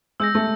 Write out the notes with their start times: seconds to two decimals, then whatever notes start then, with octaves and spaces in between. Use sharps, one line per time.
0.20 G#3 E6 G6 A#6
0.35 A3